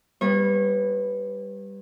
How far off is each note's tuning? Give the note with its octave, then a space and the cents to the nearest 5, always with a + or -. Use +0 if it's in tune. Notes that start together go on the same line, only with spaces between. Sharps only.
G3 +5 B3 +0 C#5 -35